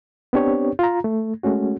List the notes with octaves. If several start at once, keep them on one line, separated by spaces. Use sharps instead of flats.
B3 C4 D4 G4 C#5
F4 A#5
A3
G#3 A3 C#4 F#4